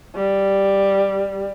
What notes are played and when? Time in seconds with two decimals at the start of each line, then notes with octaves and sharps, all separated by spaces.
0.15 G3